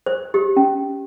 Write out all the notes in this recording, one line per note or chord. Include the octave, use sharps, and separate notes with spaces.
C5
G4
C#4